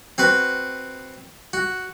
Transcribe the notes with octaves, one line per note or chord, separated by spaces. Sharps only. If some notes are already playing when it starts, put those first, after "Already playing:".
C4 F#4 B4
F#4